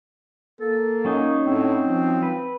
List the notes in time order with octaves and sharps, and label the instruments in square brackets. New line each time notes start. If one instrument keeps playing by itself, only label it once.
[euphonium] A#3 [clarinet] A4
[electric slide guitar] F#3 C#4 D#4
[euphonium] A2 [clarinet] C4
[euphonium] F3
[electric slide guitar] B4